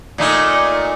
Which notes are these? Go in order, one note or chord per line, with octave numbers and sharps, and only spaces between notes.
A#2 A3 D#4